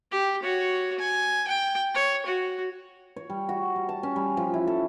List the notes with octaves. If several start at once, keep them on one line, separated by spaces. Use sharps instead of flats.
G4
F#4 C#5
G#5
G5
C#5
F#4
C#5
G3
F#4
G3
A5
C#4
G3
F3
E4
A4